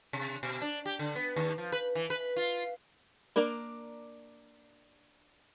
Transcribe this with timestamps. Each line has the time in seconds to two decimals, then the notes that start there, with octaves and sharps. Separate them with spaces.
0.13 C3
0.43 B2
0.62 D4
0.86 G4
0.99 D3
1.15 B3
1.36 D#2
1.58 F3
1.72 B4
1.95 E3
2.10 B4
2.36 F4
3.36 A#3 D4 A#4 D5 A#5